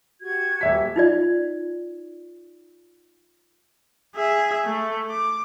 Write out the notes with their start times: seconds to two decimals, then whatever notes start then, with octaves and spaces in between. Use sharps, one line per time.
0.21 F#4 G4 G#6
0.61 D#1 E5 B6
0.96 D#4 F4 D5
4.15 G#4 E5
4.66 A3
5.10 D6